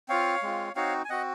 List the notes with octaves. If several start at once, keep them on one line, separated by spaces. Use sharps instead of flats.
C4 F4 C#5 F5
G#3 C4 F4
C4 D#4 F#4 C#5 F5
G#5
C4 F#4 D#5 F#5